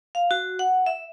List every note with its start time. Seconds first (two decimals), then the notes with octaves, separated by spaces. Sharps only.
0.15 F5
0.31 F#4
0.59 F#5
0.86 E5